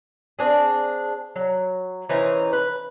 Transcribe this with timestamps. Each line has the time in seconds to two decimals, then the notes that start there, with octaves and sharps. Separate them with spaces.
0.39 C4 D4 G#4
1.36 F#3
2.09 E3 C#4 D#4 C5
2.53 B4